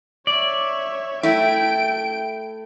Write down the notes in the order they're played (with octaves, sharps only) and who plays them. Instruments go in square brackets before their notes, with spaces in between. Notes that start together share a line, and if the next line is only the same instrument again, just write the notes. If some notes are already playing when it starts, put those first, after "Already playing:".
[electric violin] C#5 E5 [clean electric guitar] D5
[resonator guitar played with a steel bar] A3 E4 [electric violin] G5 D7